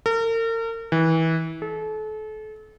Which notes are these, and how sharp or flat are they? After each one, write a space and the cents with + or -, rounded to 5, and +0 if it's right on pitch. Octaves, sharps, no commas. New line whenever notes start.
A#4 -40
E3 -25
A4 -35